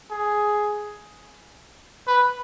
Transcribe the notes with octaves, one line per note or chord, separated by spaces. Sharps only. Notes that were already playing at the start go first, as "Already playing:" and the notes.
G#4
B4